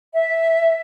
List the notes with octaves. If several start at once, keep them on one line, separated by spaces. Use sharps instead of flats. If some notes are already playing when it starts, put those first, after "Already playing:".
E5